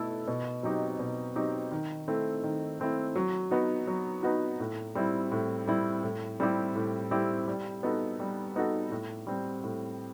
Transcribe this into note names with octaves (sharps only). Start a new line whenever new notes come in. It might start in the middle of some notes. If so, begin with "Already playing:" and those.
Already playing: B2 A3 E4 A4
B2
F#3 C4 D#4 G4
B2
F#3 C4 D#4 G4
D#3
A3 C4 E4
D#3
A3 C4 E4
F#3
B3 D#4 F#4
F#3
B3 D#4 F#4
A2
G3 C4 E4
A2
G3 C4 E4
A2
G3 C4 E4 G4
A2
G3 C4 E4 G4
G3
B3 D#4 F#4 A4
G3
B3 D#4 F#4 A4
A2
G3 C4
A2